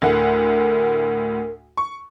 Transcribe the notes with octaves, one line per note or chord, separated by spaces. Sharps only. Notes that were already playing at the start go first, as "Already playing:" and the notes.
D2 A2 A#4 F#5
C#6